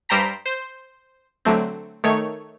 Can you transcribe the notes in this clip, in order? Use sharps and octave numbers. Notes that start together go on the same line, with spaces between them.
G2 G3 C5 G5 A#5 B6
C5
D3 F#3 A3 C4
D#3 A3 C#5